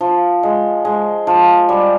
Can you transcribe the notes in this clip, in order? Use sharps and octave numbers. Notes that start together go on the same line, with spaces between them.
F3
G#3
G#3
F3
G3